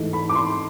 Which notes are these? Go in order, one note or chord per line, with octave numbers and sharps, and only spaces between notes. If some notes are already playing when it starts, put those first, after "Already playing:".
Already playing: G#2 E3 A3
B5
D6
C6